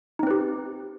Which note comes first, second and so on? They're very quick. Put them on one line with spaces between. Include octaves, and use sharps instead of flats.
D#4 C4 B4 G4